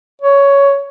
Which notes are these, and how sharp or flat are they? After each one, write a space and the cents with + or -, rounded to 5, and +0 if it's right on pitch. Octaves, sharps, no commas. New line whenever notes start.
C#5 +10